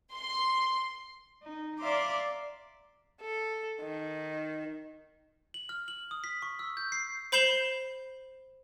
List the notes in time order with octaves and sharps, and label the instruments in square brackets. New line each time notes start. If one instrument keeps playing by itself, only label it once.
[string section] C6
[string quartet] D#4
D5 E5 F5 A#5 C6 D6
[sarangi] A4
D#3
[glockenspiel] F#7
F6
F#7
D#6
B6
C#6
E6
G6
C7
[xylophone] C5 B5 G6 C7 E7 G7